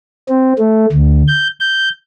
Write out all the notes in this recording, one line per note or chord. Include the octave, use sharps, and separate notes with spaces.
C4
A3
D2
G6
G6